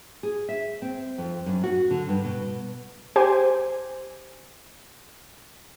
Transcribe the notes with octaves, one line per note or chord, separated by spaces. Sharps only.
G#4
E5
C4
F2
F#2
F#4
D3
G2
B2
G4 C5 G#5